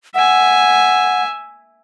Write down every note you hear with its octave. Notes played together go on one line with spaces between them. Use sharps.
E5 F#5 G#5